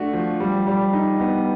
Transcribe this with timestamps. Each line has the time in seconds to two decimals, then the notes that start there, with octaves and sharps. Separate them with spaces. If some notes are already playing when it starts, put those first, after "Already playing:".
Already playing: A3 D4 F#4
0.13 F3
0.40 G3
0.67 G3
0.93 D#4
1.19 B3